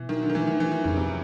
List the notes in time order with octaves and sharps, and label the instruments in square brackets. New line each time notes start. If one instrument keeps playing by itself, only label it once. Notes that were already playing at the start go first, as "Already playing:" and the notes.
Already playing: [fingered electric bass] B2 [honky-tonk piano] E3
[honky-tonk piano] D#3 [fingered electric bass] F#3
[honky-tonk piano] D3
D#3
[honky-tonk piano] E3 [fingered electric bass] A3
[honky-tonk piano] D#3
[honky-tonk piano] E3 [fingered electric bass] F#3
[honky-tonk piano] D#3
[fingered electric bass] F2 [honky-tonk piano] C#3
[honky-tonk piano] C3